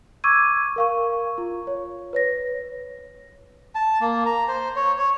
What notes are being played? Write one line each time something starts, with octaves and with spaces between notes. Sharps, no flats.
C#6 D6 E6 G#6 D#7
A#4 F5 C#6
F4
C#5
B4 C#5 A#6
A5
A#3
A#5
C5
C#5
C#5